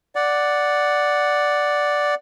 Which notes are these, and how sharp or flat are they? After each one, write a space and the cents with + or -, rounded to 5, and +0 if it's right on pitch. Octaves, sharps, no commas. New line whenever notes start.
D5 +0 F#5 +0